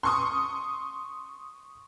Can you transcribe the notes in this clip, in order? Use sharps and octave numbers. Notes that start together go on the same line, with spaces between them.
C6 C#6 D#6